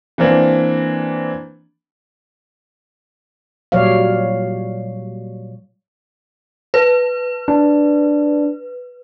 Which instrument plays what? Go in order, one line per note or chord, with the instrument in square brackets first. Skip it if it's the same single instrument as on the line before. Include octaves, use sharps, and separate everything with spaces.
[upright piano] E3 A#3 C4 D4
[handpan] A#2 F#3 G3 C#5 D5 F5
[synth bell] B4
[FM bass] D4